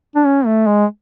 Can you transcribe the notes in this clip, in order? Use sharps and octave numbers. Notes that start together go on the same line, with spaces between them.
D4
C#4
A3
G#3